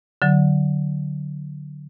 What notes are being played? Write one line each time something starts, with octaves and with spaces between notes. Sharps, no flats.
D3 F#3